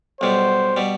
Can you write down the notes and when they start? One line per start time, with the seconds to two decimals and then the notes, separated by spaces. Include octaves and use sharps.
0.21 B1 B2 G3 C5
0.77 B2 G3